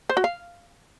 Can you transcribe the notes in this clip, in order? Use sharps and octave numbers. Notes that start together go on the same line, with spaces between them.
C5
F#4
F5